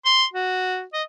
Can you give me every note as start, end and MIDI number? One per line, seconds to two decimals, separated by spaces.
0.06 0.25 84
0.34 0.83 66
0.93 1.03 75